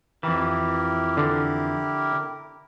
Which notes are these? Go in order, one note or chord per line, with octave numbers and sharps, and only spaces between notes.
F2 E3 E4 G4 A#4
D3